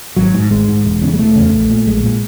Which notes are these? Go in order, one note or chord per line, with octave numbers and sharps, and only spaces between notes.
G#1 F#3
G#2
G#1 G#3
G#2
E1
E2 C#3
G#3
E1 A3
E2 C#3
A#1
A#2
A#1 G#3
A#2